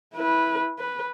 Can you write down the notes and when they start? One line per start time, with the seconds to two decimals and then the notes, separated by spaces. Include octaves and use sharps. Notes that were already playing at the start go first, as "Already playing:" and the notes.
0.14 E4 B4
0.80 B4